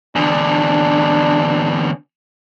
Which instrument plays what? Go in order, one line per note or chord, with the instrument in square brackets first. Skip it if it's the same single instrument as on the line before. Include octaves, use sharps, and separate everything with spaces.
[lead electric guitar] E2 D3 [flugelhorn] D4